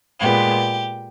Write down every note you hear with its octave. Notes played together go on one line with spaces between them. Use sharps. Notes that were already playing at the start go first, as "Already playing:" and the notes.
A#2 G#3 B3 G4